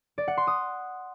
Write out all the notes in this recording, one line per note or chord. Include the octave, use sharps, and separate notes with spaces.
D5
F#5
C6
D#6